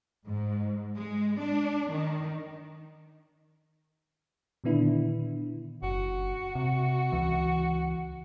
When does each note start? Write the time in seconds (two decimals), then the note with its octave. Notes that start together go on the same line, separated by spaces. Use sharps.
0.25 G#2
0.96 G#3
1.40 D4
1.91 D#3
4.64 A#2 D3 D#3 B3 D4 E4
5.83 F#1 F#4
6.55 C3
7.12 C#2 E3